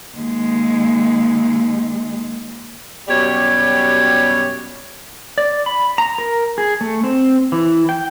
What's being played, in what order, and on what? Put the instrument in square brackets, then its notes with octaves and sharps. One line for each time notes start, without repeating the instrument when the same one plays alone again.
[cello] D#2 G#3
[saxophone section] F#2 B2 G3 G4 C#5
[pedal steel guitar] D5
B5
A#5
A#4
G#4
A3
C4
E3
G5